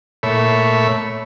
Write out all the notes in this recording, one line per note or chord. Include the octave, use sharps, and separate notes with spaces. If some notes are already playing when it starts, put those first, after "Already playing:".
A#2 A3 C#5 E5 B5